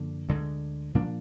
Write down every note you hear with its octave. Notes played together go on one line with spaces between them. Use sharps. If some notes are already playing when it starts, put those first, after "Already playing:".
Already playing: F#2 D3 F3 A#3
D2 D3 G#3
A#2 F3 A#3 D4